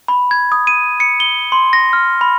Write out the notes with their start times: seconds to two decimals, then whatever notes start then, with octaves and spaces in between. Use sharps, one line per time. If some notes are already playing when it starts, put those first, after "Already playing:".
0.08 B5
0.31 G#6
0.52 D#6
0.67 D#7
1.00 C#7
1.20 G7
1.52 C6
1.73 A#6
1.93 F6
2.21 B5